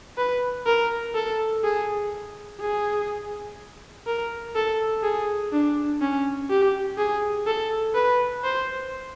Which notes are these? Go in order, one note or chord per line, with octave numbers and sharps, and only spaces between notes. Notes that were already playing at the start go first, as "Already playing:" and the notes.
B4
A#4
A4
G#4
G#4
A#4
A4
G#4
D4
C#4
G4
G#4
A4
B4
C5